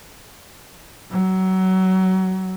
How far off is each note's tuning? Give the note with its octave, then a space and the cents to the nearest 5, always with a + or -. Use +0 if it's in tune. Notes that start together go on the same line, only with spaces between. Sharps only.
F#3 +25